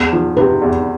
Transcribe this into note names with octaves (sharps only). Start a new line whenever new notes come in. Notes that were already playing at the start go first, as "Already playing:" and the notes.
Already playing: E2
F3
C3 B4
E2